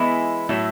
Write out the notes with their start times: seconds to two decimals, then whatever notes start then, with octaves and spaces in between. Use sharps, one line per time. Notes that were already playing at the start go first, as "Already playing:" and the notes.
Already playing: E3 G#3 B3 E4
0.49 A2 F#3 A3 E4 A4